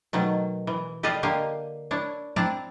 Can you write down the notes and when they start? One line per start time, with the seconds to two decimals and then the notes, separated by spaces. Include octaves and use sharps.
0.13 B2 D#3 F#3 A3
0.67 E3
1.03 G4 A4 B4 D5 D#5 F5
1.23 D3 A#3 G4 A#4 D#5 F5
1.91 D4 E4 C#5
2.36 C4 D4 E4 D5 A5 A#5